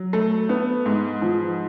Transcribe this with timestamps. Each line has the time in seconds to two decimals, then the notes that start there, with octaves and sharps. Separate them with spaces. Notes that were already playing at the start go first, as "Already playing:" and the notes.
Already playing: F#3
0.13 A3
0.49 B3
0.86 G#2
1.22 F3